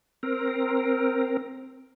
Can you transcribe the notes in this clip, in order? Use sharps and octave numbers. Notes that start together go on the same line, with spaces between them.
C4 A#4